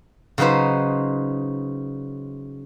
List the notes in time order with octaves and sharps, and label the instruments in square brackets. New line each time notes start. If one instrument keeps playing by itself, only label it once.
[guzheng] C#3 F#3 D#4 B4 C5